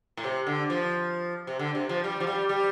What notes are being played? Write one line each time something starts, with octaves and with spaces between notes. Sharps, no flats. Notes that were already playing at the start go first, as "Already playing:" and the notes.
A2
C3
D3
F3
C3
D3
C3
F3
G3
F3
G3
G3